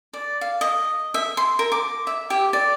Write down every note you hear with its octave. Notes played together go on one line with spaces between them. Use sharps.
D5
F5
D#5
E5
C6
A#4
D6
E5
G4
D5